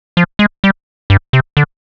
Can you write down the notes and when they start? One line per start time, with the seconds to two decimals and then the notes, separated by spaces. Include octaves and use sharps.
0.17 F3
0.39 G#3
0.64 G3
1.10 G2
1.33 C3
1.57 D3